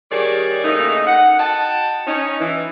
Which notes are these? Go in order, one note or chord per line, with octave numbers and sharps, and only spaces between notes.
D#3 G3 G4 G#4 C#5 D5
A2 C#3 A3 A#3 D#4
F#5
F#4 D#5 G5 A5
C#4 D#4
E3